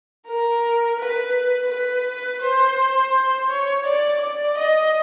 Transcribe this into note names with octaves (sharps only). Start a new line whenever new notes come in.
A#4
B4
B4
C5
C#5
D5
D5
D#5